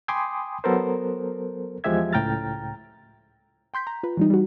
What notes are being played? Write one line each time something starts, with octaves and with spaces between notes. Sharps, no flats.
G5 G#5 B5 C6 D6 D#6
F#3 B3 A4 A#4 C5
E2 F3 G#3 G4 E5 G#6
C#2 A2 G5 A#5 F6 A6
G5 C6 G6 B6
A#5
F4 B4
E3 G3 D#4
G3 F#4